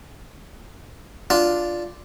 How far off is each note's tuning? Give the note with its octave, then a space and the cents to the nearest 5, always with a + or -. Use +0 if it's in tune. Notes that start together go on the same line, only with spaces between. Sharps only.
D4 +0 F4 +0